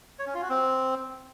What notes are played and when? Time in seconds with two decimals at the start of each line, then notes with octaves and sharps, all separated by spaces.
0.19 C#5
0.27 C#4
0.34 F4
0.42 F#4
0.50 C4